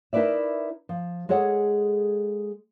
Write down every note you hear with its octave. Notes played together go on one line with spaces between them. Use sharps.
D#4 E4 A#4 B4 D5 E5
F3
G#3 G#4 A4 C#5 F#5